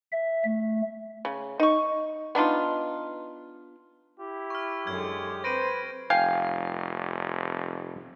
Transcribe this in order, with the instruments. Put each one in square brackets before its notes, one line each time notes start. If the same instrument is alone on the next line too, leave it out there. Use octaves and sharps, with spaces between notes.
[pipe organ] E5
A3
[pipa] C#3
D#4 C#6
B3 D4 D#4 F4
[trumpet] E4 [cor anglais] G4
[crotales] C#6 F6
[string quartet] F#2 D3 G#3 [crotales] F6 G#6
[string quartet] C4 [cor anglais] B4 [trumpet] C5 [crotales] A#6 D7 D#7
[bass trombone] F1 [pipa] F5 [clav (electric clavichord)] G5 G#5